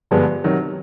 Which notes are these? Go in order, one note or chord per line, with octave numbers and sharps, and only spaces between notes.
G2 D3 F3 G#3 B3
C3 D#3 F#3